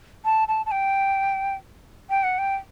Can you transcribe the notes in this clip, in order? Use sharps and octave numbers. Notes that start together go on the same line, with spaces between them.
A5
A5
A5
G5
G5
F#5
G5